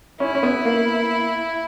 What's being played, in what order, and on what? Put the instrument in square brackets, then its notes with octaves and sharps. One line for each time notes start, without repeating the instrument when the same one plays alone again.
[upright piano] C#4 [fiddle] E4
[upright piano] C#4
B3
A#3